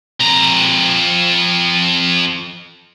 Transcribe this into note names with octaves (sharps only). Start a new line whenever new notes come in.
F2 A#5